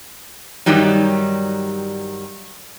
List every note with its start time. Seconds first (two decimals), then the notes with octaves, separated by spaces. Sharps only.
0.66 G2 D#3 F#3 G3 D#4